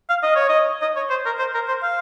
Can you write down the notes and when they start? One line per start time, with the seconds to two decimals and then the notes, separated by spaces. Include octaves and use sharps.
0.09 F5
0.23 D#5
0.36 C#5
0.49 D#5
0.82 D#5
0.96 C#5
1.10 C5
1.26 A#4
1.39 C5
1.54 A#4
1.68 C5
1.83 F5